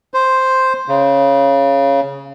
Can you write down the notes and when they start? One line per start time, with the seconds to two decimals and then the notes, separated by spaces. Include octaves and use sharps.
0.14 C5
0.88 C#3